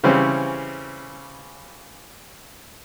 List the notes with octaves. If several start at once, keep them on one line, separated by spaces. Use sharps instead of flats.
C#3 E3 G3 C4 C#4